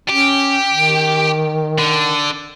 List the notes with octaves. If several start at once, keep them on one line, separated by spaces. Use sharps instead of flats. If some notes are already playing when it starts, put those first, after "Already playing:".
C#4 G4
D#3
D3